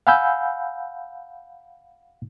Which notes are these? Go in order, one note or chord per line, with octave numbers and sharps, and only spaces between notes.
F5 F#5 G#5 B5 E6 G6